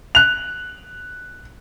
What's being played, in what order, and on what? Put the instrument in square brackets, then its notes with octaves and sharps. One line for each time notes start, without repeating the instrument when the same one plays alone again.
[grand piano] F#6 F7